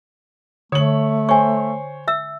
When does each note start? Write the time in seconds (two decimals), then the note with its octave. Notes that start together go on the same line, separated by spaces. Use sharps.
0.72 D3 A3 C#5 F#7
1.29 C5 C#5 G#5 C#6
2.08 E5 E6